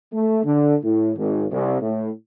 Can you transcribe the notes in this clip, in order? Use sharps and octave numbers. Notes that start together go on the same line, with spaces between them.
A3
D3
A2
G#1
C2
A2